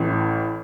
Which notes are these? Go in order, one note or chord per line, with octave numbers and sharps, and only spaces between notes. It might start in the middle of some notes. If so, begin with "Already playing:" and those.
Already playing: A1 A2 E3